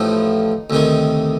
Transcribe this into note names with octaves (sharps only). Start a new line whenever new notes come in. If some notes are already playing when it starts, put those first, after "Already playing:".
Already playing: A1 A2 F3 D#4
D2 C3 D#3